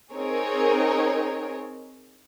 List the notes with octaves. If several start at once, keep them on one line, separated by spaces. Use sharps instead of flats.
C4 D#4 G#4 A#4 C#5